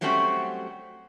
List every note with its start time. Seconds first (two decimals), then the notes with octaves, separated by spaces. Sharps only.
0.01 F#3 G3 A3 C4 C#4 F#4